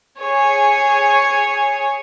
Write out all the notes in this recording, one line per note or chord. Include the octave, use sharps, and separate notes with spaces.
G#4 C#5